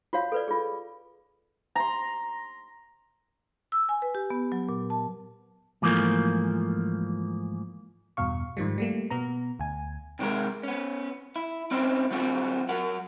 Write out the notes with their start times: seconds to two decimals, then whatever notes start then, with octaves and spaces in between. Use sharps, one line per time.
0.13 F4 F#4 C#5 F5
0.32 A4 B4 D5
0.48 F4 G#4
1.75 A#5 C6
3.72 E6
3.89 G#5
4.02 B4
4.15 G4
4.30 B3
4.52 F#3
4.69 A#2
4.90 A5
5.82 G#2 E3 F3 A3 A#3
8.17 E2 G2 B2 F5 C#6
8.57 G#2 D#3 F3 G3
8.78 G3 A3 A#3
9.10 B2 B3 A#5
9.59 D2 G#5
10.19 C3 D#3 F#3 G#3 A#4
10.63 B3 C#4
11.36 E4
11.71 C4 C#4 D#4 E4 C5
12.11 D3 F#3 C4 F4 F#4 G#4
12.69 F#3 A#4 F#5